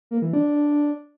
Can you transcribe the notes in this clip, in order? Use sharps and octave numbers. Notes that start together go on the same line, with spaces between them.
A#3
E3
D4